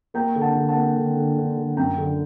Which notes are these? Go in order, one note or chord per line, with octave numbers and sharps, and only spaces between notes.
A#3 G5 A#5
D3
F#5 A5
D3
F#5 A5
A#3
D3
D3
D3
D3
F#2 G5 A#5
D3